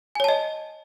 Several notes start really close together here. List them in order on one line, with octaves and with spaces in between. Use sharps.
G#5 C#5 A5 D#5